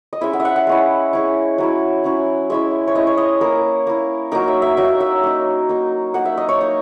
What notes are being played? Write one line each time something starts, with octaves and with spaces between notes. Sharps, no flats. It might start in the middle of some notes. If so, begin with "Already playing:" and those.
D#5
G#3 C#4 E4 E5
F#5
E5
F#5
F#5
G#3 C#4 E4
G#3 C#4 E4
F#3 C#4 E4
F#3 C#4 E4
G#3 C#4 E4 E5
C#5
G#3 C#4 E4 D#5
C#5
D#5
A#3 E4 A#4
A#3 E4
F#3 A#3 D#4 A#4
E5
E5
F#3 A#3 D#4 E5
E5
A#3 D#4
A#3 D#4
A#3 D#4 F#5
E5
D#5
C#5
A#3 D#4